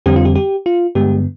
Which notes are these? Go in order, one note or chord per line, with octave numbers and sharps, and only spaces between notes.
F2 D3 G3 C4 G4
F4
G4
G4
F4
G2 D3 G#3 B3 G4